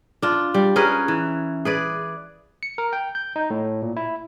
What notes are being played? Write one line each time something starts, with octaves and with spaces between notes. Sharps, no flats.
D4 F4
G3
C#4 G#4 A#4 B4
E3
G#4 B4 D5
C#7
A#4
G5
G6
D#4
A2
A#2
E4